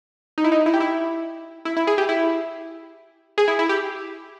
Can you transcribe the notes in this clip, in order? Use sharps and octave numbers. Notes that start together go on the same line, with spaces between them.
D#4
E4
D#4
E4
G4
E4
E4
E4
G#4
G4
E4
G#4
E4
E4
G4